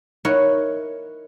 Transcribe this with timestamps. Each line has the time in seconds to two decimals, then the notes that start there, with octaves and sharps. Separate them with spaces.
0.25 D#4 E4 A#4 C#5 F#5